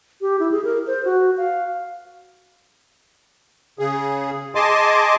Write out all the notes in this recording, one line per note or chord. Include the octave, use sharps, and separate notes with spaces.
G4
E4
G#4
A#4
C5
F#4
F5
C#3 G#4
G#4 D#5 G#5 A5 C6 D6